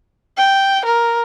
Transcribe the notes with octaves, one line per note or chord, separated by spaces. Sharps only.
G5
A#4